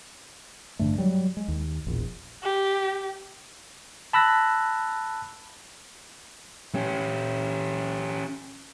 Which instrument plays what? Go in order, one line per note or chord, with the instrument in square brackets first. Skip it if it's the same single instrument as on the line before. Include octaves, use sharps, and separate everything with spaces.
[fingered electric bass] A1 G2 D3 A3
F#3 G3
G#3
D#2
E1 A#1
[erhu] G4
[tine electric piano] A5 B5 E6 F#6 A#6
[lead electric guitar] C#4 G4